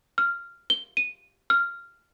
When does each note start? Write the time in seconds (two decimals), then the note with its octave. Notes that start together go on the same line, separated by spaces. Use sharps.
0.18 F6
0.70 G7
0.97 D#7
1.50 F6